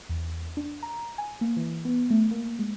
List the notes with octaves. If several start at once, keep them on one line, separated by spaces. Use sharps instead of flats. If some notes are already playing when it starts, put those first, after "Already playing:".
E2
D4
A#5
G#5
A#3
E3
B3
A3
A#3
G#3